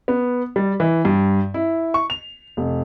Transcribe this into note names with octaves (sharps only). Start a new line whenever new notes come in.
B3
G3
E3
G2
E4
C#6
F7
F1